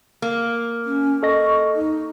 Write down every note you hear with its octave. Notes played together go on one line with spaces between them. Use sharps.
A#3
C#4
A4 D#5 C#6 A#6
D#4